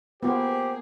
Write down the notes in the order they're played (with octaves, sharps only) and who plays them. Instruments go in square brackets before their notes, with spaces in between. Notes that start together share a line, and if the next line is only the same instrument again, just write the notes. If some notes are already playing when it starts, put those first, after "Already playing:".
[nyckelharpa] A#3 G#4 [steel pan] B3 F4 [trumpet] G4 [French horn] C5